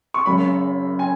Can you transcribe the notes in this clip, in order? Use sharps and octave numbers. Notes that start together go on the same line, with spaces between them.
C#6
F#1 F#2 C#3 B5
G#5